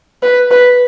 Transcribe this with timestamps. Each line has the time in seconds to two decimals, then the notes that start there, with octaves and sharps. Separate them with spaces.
0.23 B4
0.51 B4